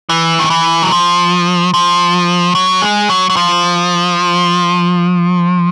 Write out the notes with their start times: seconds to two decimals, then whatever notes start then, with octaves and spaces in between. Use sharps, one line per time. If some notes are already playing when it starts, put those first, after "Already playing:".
0.09 E3
0.39 D#3
0.50 E3
0.82 F#3
0.92 F3
1.74 F3
2.55 F#3
2.82 G#3
3.09 F#3
3.30 F#3
3.36 F3